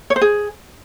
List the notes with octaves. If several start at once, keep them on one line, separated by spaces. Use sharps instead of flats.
C#5
C5
G#4